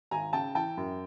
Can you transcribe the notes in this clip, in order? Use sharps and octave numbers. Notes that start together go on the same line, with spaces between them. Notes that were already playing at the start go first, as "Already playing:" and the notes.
G#1 G#5 A#5
C#3 G5 A5
E3 G5 A5
F#2